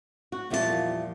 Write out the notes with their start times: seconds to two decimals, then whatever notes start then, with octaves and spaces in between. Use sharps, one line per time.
0.32 F#4
0.50 E2 A#2 F3 G3 F#4 A5